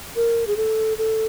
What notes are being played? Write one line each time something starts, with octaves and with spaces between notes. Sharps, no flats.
A#4
G#4
A4
A4